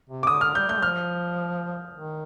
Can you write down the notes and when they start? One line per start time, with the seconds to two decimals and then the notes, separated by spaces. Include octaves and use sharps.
0.10 C3
0.23 D6
0.27 D3 D#6
0.41 D3 F6
0.55 G3 G6
0.69 A3 G6
0.82 F3 F6
1.94 D#3